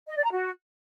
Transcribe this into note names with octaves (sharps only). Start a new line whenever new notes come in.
D#5
D5
A#5
F#4